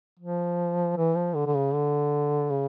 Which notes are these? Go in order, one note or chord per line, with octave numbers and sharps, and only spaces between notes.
F3
E3
F3
D3
D3
C#3
D3
C#3